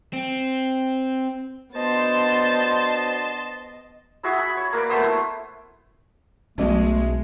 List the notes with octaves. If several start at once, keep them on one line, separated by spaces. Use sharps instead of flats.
C4
B3 D4 F#4 C5 D#5 A5 C6
E4 F#4 G#4 E5
B5
C#5
A#3 B4 D5
A3 B3 C5 D#6
E4
B1 B2 F#3 G#3 A3 C#4